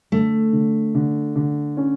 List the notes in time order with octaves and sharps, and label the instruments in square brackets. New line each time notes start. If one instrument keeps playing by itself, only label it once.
[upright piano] D3 [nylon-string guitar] A3
[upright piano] D3
D3
D3
C#4